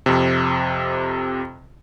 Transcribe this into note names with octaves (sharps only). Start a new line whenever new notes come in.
F2 C3